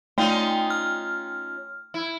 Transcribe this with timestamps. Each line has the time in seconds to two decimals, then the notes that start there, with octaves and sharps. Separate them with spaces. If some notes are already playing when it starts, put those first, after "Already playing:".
0.18 A3 C#4 D#4 F4 G5
0.70 F6
1.94 E4